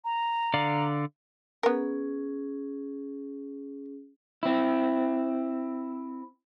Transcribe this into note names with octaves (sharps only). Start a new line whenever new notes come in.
A#5
D3 D5 F5
B3 C#4 G#4 A#4
C4 E4